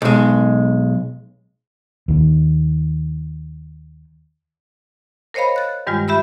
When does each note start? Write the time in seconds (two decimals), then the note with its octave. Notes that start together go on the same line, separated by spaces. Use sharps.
0.02 B1 G#3
2.08 D#2 D#3
5.34 A#4 C5 C#5 D#5 F5 B5
5.56 F#6 A6
5.87 G2 D#3 G3 G#3 F4
6.08 G4 E5 B5 E6